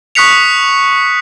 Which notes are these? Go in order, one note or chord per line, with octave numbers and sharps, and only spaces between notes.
C#6 D#6 F#6 B6 C#7 F7